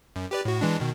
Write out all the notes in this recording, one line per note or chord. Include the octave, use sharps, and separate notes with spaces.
F#2
G4 B4 D5
A2 F#4
E3 G#3 D4
B2 D#3